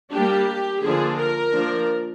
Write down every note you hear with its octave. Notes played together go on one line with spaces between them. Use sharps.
G3 A#3 D4 G4
D3 F3 A#3 D4 G#4
A#4
F3 A#3 D4